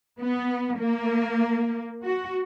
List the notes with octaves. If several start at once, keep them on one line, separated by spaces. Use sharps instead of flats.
B3
A#3
F#4